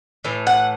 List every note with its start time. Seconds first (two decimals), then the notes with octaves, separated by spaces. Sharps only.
0.24 A2 E3
0.47 F#5